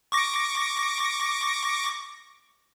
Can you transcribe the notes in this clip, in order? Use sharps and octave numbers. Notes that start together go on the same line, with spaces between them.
C#6 D6 A#6